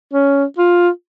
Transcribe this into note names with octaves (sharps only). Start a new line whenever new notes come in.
C#4
F4